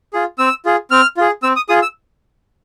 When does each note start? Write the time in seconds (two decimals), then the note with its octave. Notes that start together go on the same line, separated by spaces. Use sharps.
0.13 F4 G#4
0.38 C4 E6
0.65 F4 G#4
0.91 C4 F6
1.17 F4 G#4
1.43 C4 E6
1.56 D#6
1.69 F4 G#4 D#6
1.82 E6